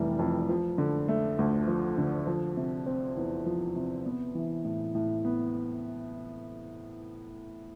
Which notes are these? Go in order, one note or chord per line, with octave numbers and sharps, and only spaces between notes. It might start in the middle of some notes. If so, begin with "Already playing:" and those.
Already playing: F1 F2 E3 G3
F2
F3
D3
A3
D2
F3
D3
F3
C3
C4
E2
F3
C3
B3
E3
A2
A2
B3